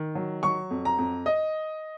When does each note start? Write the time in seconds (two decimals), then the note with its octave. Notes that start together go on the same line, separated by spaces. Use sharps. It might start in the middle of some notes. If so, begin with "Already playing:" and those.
Already playing: D#3
0.15 F#3
0.43 F#3 C#6
0.71 F2
0.85 A#5
0.98 F2
1.26 D#5